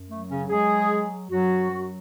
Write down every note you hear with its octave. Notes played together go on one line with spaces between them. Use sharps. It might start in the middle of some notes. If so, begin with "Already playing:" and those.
Already playing: F#2
F#3 A3
C#3 C#4
F#3 G#3 G#4
F#3
F#2 F#3 F#4
F#3